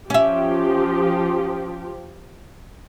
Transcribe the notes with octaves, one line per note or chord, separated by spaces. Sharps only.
F3 C#4 G4 E5